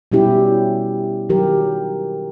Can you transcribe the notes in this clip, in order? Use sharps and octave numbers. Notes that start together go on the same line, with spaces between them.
B2 G3 C#4 E4 G4
D#3 F#3 G4 A#4